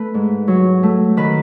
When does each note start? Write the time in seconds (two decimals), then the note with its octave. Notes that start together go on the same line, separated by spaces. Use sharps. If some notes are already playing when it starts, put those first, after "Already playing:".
Already playing: A3 B4
0.14 G#2
0.48 F#3
0.83 A3
1.17 D#3 B4